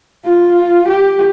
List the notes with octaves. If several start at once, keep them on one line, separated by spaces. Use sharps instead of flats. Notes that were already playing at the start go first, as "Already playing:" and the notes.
F4
G4